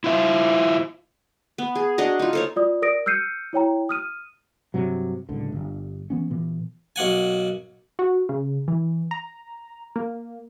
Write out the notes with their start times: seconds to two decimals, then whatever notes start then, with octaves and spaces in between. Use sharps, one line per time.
0.04 E4 F4 C5 E5
1.58 B3
1.75 G#4
1.98 D4 F#4 D#5 A#5
2.19 D#4 F4
2.33 A4 C5 C#5
2.56 F4 D5 D#6
2.82 A#4 D5 D#6 A#6 D7
3.06 E6 F6 G6 C7 C#7 D#7
3.53 E4 C#5 G5 A#5
3.89 D#6 F6 D#7
4.74 G2 C3 F#3
5.29 D1 C#2 D3
5.52 G1 G2
6.10 E3 B3 C#4
6.30 A#2 E3 B3
6.96 B1 A#3 F#5 G#5
7.99 F#4
8.29 C#3
8.68 E3
9.11 A#5
9.96 A#3